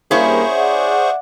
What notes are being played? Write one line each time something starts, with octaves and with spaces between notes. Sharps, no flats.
G2 A#3 C#4 E4 G#4 C5 C#6
D5 E5 F#5